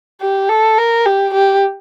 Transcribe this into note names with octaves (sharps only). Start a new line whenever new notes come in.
G4
A4
A#4
G4
G4